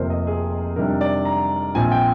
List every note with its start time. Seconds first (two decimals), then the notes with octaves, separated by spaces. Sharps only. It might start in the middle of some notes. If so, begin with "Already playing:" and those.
Already playing: F1 F2 C3 F3 A#3 A#4 C5
0.10 D#5
0.27 G#4
0.76 F2 C3 D#3 G3 D4 A#4
1.01 D5
1.25 A#5
1.75 A#1 A#2 F3 C4 G#5
1.91 G5